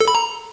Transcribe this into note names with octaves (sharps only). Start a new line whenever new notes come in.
A4
B5
A#5